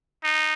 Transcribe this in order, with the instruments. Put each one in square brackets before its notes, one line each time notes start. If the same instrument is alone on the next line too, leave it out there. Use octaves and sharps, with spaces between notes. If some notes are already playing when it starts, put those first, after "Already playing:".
[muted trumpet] D#4